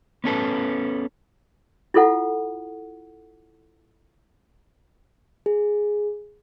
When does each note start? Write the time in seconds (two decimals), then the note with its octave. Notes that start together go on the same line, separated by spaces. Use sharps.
0.24 B3 C#4 A4 B4
1.94 E4 F4 A4 F#5
5.46 G#4